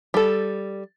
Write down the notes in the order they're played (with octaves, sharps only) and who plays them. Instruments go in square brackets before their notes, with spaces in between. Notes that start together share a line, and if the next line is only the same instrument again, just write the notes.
[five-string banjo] G3 A4